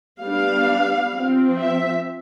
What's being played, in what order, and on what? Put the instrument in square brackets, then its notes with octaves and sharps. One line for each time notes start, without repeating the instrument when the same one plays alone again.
[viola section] G3 B3 D4 F5
F3 C4
E5